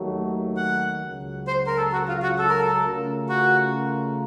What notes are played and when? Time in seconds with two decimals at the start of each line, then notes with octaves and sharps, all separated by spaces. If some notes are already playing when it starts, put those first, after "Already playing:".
Already playing: D#2 D#3 F#3 A3
0.57 F#5
1.02 C#2 C#3 F#3
1.47 C5
1.67 A#4
1.77 A4
1.92 F#4
2.08 F4
2.23 F#4
2.39 A4
2.50 A#4
2.61 A4
2.83 C#3 A3 C#4 F4 A#4
3.29 F#4